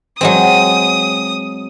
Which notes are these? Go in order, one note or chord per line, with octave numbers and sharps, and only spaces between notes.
F#3 G#3 C4 D#6